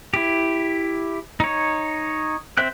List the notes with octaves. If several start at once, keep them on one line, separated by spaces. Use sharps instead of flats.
E4 G4
D#4 C#5
C4 C5 E5 G5 F#6